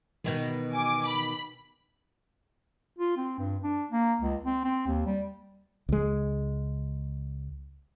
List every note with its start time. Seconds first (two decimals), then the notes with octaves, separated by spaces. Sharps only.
0.24 B2 D#3 E3 B3
0.72 G#5 D6
1.05 B5
2.99 F4
3.17 C4
3.39 G2
3.64 D4
3.91 A#3
4.21 C#2
4.46 C4
4.64 C4
4.87 D#2
5.06 G3
5.89 C#2 G#3